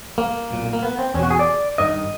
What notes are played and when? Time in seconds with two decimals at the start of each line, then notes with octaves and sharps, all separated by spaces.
0.18 A#3
0.51 B1 A#2
0.73 A#3
0.83 B3
0.99 C4
1.14 E2 C#4
1.19 B2 F#4
1.31 G#4
1.39 D5
1.78 G2 D#3 D#5